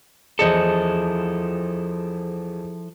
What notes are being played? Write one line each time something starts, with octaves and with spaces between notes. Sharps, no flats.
E2 F3 E4 G#4 A4 C5 D#5 C#7